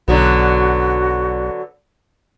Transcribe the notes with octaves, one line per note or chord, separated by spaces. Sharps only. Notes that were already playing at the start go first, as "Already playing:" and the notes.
B1 D3 F#3 B3 F#4